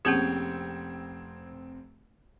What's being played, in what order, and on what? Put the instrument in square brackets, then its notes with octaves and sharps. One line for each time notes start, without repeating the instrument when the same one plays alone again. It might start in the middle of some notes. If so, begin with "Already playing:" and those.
[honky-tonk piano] F1 C4 [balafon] A#3 C#4 G#4 [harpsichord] C#5 G5 C#6